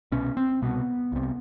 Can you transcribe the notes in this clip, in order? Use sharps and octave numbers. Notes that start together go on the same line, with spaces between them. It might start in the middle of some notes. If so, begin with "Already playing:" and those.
C2 B2 C#4
C4
C2 B2 B3
C2 C3